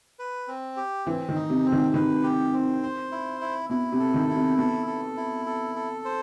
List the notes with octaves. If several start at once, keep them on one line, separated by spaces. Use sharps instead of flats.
B4
C4
G4
E3 C4
D#3
D#4
C3
C4
D#3
D#3 B4
G4
C4
C5
E4
E4
B2 E4
C3
A4
D#3
E4
C3
B2 A4
A4
E4
A4
A4
C5